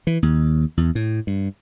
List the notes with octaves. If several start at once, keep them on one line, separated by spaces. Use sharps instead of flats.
E3
D#2
E2
A2
G2